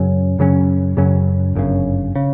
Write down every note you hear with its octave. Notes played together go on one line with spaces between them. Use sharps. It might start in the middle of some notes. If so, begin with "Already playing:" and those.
Already playing: F#2 C#3 F#3 C#4
F#2 C#3 F#3 C#4
F#2 C#3 F#3 C#4
G1 F#2 C#3
C#3